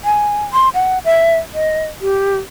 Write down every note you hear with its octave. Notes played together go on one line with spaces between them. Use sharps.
G#5
C6
F#5
E5
D#5
G4